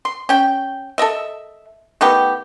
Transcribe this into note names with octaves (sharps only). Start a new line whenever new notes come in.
C6
C#4 G5
A4 A#4 D#5 E5
D#3 A3 B3 G4